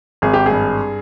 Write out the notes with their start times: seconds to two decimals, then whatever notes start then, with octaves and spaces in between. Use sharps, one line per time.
0.22 G#1 G#4
0.34 G4
0.46 G#4
0.51 G2